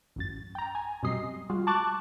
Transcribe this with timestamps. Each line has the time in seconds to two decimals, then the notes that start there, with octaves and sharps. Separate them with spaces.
0.16 A1 F#2 A6
0.55 G5 A#5
0.75 G#5
1.03 F#2 B2 G3 C4 D#5 C7
1.50 G3 G#3 F4 F#4
1.67 A5 C#6 D6 F#6 A6